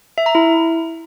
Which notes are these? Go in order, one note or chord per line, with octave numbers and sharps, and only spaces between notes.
E5
A#5
E4